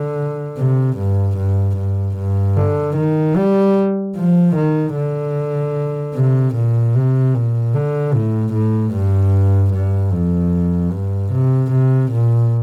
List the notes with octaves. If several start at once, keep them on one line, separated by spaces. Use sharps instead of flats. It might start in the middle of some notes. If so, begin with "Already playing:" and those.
Already playing: D3
C3
G2
G2
G2
G2
D3
D#3
G3
F3
D#3
D3
C3
A#2
C3
A#2
D3
A2
A2
G2
G2
F2
G2
C3
C3
A#2